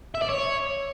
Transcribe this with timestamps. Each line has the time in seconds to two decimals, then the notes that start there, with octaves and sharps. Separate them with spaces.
0.15 E5
0.22 D5
0.29 C#5